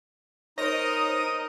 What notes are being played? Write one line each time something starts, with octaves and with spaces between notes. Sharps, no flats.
D#4 A#4 C5 C#5 D#5 A#5 D#6